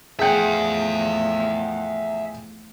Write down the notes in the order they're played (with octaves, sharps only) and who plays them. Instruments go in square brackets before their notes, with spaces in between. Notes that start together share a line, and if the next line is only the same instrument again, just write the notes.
[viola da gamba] E2 A2 F3 [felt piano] G#4 G5 [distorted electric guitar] E5 F#5